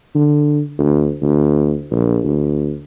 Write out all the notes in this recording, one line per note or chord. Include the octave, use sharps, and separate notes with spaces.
D3
D2
D2
A#1
D2